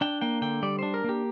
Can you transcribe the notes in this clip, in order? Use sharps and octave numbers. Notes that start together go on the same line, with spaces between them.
D4 G5
A#3 G5
D3 G5
G3 D5
D4 C5
A#4
A#3 G4